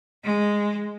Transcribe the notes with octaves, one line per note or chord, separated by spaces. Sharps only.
G#3